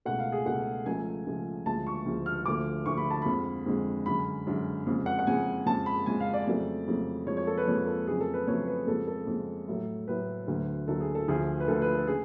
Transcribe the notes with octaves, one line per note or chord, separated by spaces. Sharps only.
C#2 B2 A3 F#5
F5
G#4
C#2 B2 A3 F#5
C#2 C#3 F3 A3 G#5
C#2 C#3 F3 A3
D2 C#3 F3 G#3 A5
C#6
D2 C#3 F3 G#3
F6
D2 D3 F3 A3 D6
D2 D3 F3 A3 C#6
B5
A5
F2 D3 G#3 B5
F2 D3 G#3
F#2 D3 G#3 B5
F#2 D3 G#3
F2 C#3 G#3
F#5
F#5
F2 C#3 G#3 G#5
F2 C#3 G#3 A5
B5
F2 C#3 G#3 G#5
F5
D5
F2 C#3 F#3 A3
F2 C#3 F#3 A3
F2 F3 G#3 C#5
C#5
A4
B4
F2 F3 G#3 C#5
A4
F2 C#3 F#3 A3 G#4
A4
B4
F2 C#3 F#3 A3 C#5
B4
F2 C#3 G#3 A4
A4
F2 C#3 G#3
A2 F#3 A3
A2 F#3 A3 B4
D2 D3 F#3 A3
D2 D3 F#3 A3 A4
G#4
A4
D2 D3 F3 A3 G#4
B4
D2 D3 F3 A3 A4
B4
A4
C#3 G#4